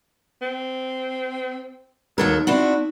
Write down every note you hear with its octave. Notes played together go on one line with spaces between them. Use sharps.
C4
D#2 F#3 D#4 A4 A#4
C4 D4 E4 F#4